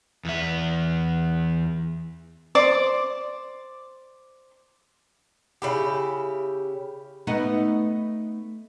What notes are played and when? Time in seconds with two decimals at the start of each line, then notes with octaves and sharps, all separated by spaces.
0.25 E2 E5
2.55 C5 D5 D6
5.62 C#3 E4 G4
7.27 A3 B3 D#4